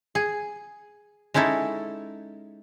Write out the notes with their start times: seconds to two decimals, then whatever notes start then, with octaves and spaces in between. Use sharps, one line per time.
0.15 G#4
1.34 G#3 C#4 D#4 E4 A4